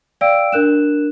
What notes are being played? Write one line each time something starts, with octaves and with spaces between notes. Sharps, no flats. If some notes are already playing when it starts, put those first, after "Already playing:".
D5 F5 G5 E6 D7
D4 A#4 F#6 E7